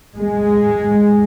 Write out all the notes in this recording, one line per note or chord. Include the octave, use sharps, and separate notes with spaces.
G#3